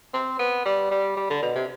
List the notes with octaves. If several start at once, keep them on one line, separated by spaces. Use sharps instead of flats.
C4
B3
G3
G3
G3
D3
B2
C3